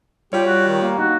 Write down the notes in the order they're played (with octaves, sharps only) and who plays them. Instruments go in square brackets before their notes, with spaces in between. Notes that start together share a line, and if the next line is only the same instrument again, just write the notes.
[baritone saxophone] G3 [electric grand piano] F4 C#5 [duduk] G4
[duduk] F#4
D#3
A#3
[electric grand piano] D#4 [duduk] F#4